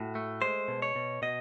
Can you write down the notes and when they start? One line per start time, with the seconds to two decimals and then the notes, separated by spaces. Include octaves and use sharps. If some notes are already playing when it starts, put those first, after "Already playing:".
Already playing: A2 F#4
0.15 A3
0.42 G#3 C5
0.68 B2
0.82 C#5
0.96 B2
1.22 B2 D#5